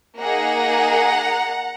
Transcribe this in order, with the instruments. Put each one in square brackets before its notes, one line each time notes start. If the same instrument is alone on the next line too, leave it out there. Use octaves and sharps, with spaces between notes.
[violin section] A#3 D#4 G#4 F#5 A#5